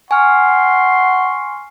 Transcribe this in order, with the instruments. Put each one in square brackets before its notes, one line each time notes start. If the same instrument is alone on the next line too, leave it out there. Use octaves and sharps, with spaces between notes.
[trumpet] F#5 [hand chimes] G#5 F6 [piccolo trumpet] C6 [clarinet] C#6